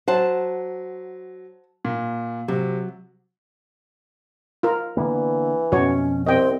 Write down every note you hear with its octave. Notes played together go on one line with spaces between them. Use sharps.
F#3 C5 F#5 A5
A#2
C3 F#3
F4 A#4
D3 E3 A#3 B3
F2 B2 C#4 F#4 C#5
C2 C4 D#5 G5